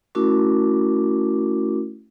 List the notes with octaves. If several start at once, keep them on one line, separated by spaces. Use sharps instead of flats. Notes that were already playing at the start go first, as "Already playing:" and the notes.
A3 C#4 E4 F#4 A#4 D6